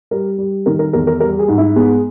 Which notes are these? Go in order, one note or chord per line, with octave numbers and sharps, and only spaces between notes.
G3 A#4
G3
D#3 A#4
A#4
E2 A#4
A#4
G3 A#4
G#4
G#2
E4
G#3 B3